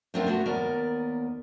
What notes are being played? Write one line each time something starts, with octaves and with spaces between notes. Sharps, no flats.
A3 B3 C4 D4 F4 A#4
A3 B3 F#4
D#2 B3 A#4 D5